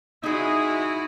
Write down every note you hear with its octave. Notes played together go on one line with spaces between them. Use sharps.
G#3 D#4 E4 F#4 G#4 D#6